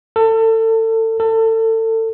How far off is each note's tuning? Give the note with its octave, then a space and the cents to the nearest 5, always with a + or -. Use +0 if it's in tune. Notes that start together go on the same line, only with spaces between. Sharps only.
A4 +30
A4 +30